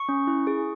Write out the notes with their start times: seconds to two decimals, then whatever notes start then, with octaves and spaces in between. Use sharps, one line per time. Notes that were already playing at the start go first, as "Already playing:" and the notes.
Already playing: C#6
0.09 C#4
0.27 E4
0.47 G#4